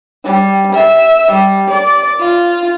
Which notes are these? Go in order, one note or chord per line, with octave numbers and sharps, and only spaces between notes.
G3
E5
G3
D5
F4